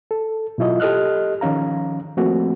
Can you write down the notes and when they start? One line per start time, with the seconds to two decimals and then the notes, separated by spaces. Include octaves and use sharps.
0.11 A4
0.58 B2 F#3 E4 F4 D#5
0.80 G4 A4 D#5 F6 F#6
1.41 D#3 F3 C#4 F5 A#5
2.17 F3 A3 A#3 C4 F#4